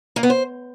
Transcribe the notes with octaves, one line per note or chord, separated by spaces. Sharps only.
A#3
B3
C5